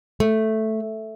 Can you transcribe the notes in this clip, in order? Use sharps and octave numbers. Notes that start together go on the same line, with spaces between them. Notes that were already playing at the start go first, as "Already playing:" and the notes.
A3